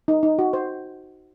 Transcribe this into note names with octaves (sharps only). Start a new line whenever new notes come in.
D#4
D#4
F#4
C5